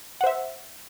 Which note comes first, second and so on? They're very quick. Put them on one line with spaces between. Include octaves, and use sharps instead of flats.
F#5 C5 E5